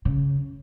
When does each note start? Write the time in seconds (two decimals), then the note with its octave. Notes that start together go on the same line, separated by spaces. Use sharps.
0.05 C#3